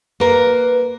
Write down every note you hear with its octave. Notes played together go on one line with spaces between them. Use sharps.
A#3 A#4 B4